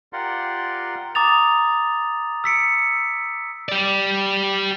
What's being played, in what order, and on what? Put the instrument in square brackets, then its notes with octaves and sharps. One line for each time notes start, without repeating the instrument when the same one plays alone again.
[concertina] F4 G4 A#4 D5 F#5 C6
[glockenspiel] A#5 D6 D#6 A6 F7
E6 B6 C#7 D7
[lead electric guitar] G4 D5